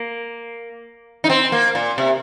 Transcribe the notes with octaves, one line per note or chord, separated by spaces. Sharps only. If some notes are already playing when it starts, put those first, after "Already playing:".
Already playing: A#3
D#4
C4
A#3
A#2
C3